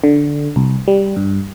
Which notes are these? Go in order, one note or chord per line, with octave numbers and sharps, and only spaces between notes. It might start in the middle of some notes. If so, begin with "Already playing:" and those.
D3
C2
G3
G2